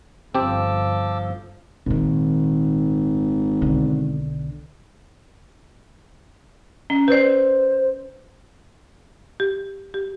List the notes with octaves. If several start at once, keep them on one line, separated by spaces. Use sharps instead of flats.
G1 F3 C4 G4 A5 D6 E6
G#1 A#2 D#3
B1 D3
C#4
B4 C5 D5
G4
G4